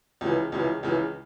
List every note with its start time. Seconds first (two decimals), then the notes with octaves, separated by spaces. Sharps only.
0.21 C#2 C#3 E3
0.52 C#2 C#3 E3
0.83 C#2 C#3 E3